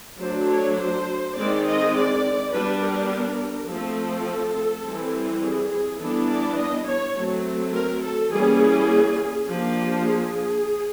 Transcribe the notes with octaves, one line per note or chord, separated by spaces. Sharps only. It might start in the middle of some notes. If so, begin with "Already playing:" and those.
F#3 A3 D4 C5
C#5
C5
D#3 G#3 C4 D5
D#5
D5
G3 B3 D4 B4
A#4
F3 A3 C4 A4
E3 G3 C4
G#4
G#4
E3 G3 B3 D4 A4
D5
D#5
C#5
F#3 A3 C4
A#4
A4
E3 G3 A#3 C#4 G#4
F3 A#3 D4 G4
G#4